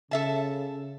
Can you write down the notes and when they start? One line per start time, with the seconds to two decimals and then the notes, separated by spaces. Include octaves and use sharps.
0.11 C#3 A4 E5 A5